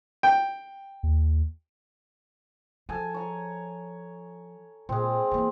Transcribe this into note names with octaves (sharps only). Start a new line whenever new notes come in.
G5
D#2
F3 A4 G#5 A5
C#5 A#5
A#2 G#3 C4
E3 A#3